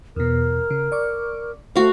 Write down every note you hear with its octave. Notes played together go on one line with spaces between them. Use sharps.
E2 B2 A#4
C#3
D5 C#6 D6
A3 F#4 C5 F5